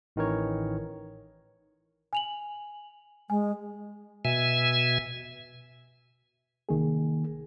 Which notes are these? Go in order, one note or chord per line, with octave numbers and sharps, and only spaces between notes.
A1 D#3 E3 A#4 C#5
G#5 F7 F#7
G#3 G#5
B2 E5 G#5
C2 D#3 A#3 G#4